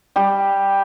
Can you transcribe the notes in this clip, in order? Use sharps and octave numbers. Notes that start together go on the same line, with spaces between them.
G3 G4